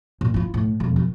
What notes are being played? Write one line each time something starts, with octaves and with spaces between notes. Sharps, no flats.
A#2
E4 F4
A2
E1 F2
D#3 F#3